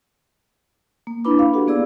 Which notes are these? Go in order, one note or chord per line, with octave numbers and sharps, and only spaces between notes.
A#3
D4 E4 B4 B5 D6
F5
F#4 G4 A4 F5 F#5
A#3 B3 G#4 D5 E6